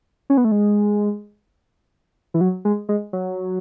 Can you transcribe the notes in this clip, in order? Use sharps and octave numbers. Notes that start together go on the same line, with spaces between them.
C#4
B3
A3
G#3
E3
F#3
G#3
G#3
F#3